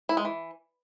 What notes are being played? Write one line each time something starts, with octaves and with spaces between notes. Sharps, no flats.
E4
G#3
E3